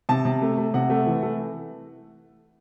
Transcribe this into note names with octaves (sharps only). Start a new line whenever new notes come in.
C3 A5
C3
A3
A3
C3 F#5
A3
E3
A3